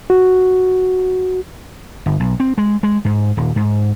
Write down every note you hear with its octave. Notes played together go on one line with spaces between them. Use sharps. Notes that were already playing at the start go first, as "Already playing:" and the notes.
F#4
G1
B1
C4
G#3
G#3
G#2
D#1
G#2